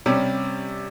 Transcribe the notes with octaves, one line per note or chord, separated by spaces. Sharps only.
C3 G3 C#4